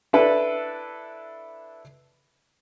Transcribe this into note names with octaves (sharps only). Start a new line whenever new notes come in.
D4 E4 A4 B4